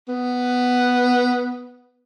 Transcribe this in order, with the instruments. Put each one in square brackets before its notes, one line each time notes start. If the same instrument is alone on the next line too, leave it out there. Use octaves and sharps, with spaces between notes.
[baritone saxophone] B3